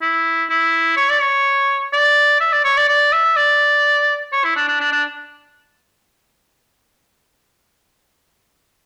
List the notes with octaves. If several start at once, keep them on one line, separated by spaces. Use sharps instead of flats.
E4
E4
C#5
D5
C#5
D5
E5
D5
C#5
D5
D5
E5
D5
C#5
E4
D4
D4
D4
D4